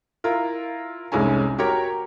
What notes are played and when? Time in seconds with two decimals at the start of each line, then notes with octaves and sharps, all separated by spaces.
0.24 E4 F4 A#4
1.12 F1 C2 G#2 G#3 C#4 G#5
1.58 F#4 G4 A#4 C#5 A#5